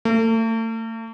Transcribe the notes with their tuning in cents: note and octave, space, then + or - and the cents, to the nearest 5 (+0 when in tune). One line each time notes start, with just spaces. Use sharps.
A3 +40